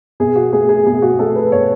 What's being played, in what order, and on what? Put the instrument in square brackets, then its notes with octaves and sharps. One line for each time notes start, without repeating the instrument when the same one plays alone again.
[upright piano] B2 G#4
F#4
A3 G#4
G#4
B2 G#4
F#4
A3 A4
B4
B2 C#5